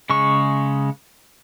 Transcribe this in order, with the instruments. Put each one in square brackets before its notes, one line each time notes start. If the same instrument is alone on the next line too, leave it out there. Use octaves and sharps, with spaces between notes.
[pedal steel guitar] C#3 G#3 C#6